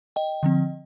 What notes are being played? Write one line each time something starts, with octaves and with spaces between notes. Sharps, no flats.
D#5 G5
D3 F3 C4